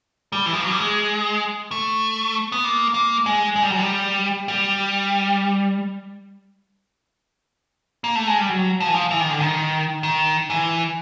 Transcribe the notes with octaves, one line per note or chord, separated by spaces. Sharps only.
G3
E3
F3
F#3
G3
G#3
A3
B3
A#3
A#3
G#3
G#3
G3
F#3
G3
G3
A#3
A3
G#3
G3
F#3
F3
E3
F3
E3
D#3
D3
D#3
D#3
E3